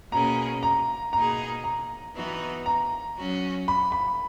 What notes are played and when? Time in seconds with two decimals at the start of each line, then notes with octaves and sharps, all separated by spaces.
0.12 B2 A#3 C#4 G#4 A#5
0.63 A#5
1.13 B2 A#3 D#4 G#4 A#5
1.64 A#5
2.15 E3 B3 D#4 F#4
2.66 A#5
3.17 F#3 C#4 F#4
3.68 B5
3.92 B5